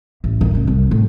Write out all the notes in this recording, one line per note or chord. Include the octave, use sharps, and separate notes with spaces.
A1
D#3
C#3
C2
A2